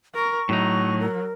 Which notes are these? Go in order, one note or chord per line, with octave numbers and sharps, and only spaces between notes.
A#4 C#6
A2 F#3 D#4
A#4